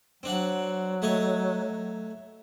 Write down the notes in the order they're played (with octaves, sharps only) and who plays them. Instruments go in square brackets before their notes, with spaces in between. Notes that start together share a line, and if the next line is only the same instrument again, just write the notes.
[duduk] F#3 [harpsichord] C4 D4 F#5
[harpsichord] A3 C#5 D#5